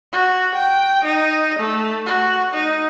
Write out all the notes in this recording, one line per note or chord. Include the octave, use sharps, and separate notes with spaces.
F#4
G5
D#4
A3
F#4
D#4